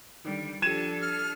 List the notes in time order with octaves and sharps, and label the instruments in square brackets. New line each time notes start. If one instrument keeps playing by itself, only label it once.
[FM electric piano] D3 D#3 [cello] G3
[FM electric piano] F3 G4 [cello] D4 A4 [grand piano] G#6 D#7 E7
[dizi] F6